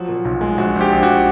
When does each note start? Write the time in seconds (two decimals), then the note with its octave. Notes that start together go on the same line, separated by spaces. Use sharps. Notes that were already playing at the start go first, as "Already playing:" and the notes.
Already playing: F3 F#3 F#4
0.09 A#2
0.25 B1
0.41 G#3
0.58 A#1 F#4
0.75 A#1
0.81 G4
0.92 A#1
1.03 F#4